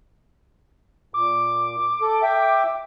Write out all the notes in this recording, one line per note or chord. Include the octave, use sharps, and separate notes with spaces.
A#2 D6
A4
E5 G5